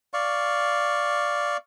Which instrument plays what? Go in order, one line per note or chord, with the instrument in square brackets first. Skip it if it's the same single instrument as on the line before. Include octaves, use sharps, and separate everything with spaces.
[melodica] D5 F5 C#6